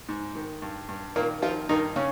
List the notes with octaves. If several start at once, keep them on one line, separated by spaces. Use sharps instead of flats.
G#2
D#3
G2
G2
A#2 D#3 A#3
D#3 F3 F4
G2 D#3 D#4
C#3 C#4